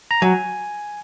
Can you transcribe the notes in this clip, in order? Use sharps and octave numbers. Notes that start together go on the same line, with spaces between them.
A#5
F#3 G#5